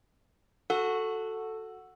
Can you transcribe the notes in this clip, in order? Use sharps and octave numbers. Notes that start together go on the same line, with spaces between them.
F#4 A4